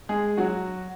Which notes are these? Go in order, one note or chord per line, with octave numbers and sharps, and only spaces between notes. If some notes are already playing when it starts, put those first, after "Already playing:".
G#3 G#4
F#3 F#4